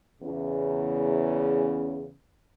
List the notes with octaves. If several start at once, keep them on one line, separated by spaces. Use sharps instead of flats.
E2 C#3